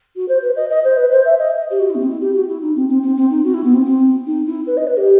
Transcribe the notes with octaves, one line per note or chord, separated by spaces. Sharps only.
F#4
C5
B4
D#5
D#5
C5
B4
C5
E5
D#5
G4
F#4
E4
B3
C4
E4
G4
F#4
E4
D#4
C4
C4
C4
C4
D#4
F#4
E4
B3
C4
C4
D#4
E4
B4
D#5
B4
G4